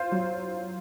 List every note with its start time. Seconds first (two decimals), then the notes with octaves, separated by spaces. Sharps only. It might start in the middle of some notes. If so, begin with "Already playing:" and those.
Already playing: F4 C5
0.12 F#3